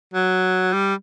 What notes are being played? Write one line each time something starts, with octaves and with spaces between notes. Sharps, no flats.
F#3
G3